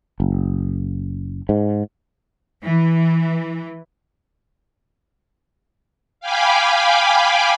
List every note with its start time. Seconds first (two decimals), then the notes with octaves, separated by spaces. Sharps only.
0.20 F#1
1.49 G#2
2.62 E3
6.20 F5 G5 G#5 B5 D6